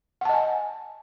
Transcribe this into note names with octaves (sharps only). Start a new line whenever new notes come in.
D#5 F#5 G#5 A5